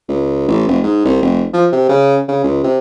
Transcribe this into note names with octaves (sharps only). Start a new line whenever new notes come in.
C#2
A1
F1
G#2
C2
F1
F3
C3
C#3
C#3
C#2
C3